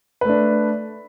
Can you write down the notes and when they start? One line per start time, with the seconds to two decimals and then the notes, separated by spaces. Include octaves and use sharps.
0.21 B4
0.25 A3
0.29 D4